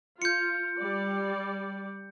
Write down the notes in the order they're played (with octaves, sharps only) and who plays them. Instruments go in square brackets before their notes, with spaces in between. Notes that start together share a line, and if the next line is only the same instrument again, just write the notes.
[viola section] F4 [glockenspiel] G6 C#7
[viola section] G3 D5